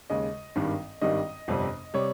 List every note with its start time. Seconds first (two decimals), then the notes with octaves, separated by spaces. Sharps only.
0.10 D#2 C#3 G#3 D#5
0.55 G#1 G2 D#3 G3
1.02 G#1 G2 D#3 G3 D#5
1.48 G1 F2 C3 G3
1.94 C3 G3 C#5